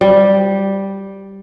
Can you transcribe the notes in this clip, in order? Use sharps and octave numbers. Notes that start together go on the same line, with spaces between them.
G3